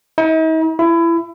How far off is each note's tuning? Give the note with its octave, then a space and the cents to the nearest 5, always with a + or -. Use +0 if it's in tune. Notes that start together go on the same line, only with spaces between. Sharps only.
D#4 +45
E4 +25